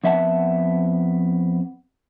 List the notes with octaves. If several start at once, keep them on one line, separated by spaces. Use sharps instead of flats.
F2 B3 E5 F#5 A5